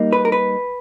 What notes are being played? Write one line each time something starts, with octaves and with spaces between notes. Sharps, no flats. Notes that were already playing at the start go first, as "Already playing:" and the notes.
Already playing: G3 A#3 D#4
B4
A#4
B4